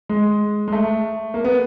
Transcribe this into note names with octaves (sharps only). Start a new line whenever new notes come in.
G#3
G#3
A3
A#3
B3